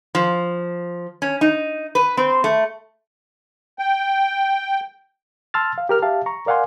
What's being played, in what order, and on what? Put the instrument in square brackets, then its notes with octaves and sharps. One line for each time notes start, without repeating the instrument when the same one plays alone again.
[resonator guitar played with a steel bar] F3
C#4
D#4
B4
C4
A3
[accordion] G5
[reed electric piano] A5 C6 E6 F6 A6
F5
G4 A#4 F6
G4 E5 F5 A5
A#5 C#6
A#4 D5 F5 F#5 G#5 C6